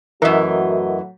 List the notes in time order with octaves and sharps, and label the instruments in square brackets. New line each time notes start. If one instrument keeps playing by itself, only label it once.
[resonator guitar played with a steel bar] F#2 E3 [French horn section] A2 F#3 F#4 [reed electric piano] A#4 D#5 E5